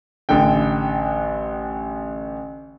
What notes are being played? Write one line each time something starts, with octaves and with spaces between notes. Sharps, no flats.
A1 D3 G5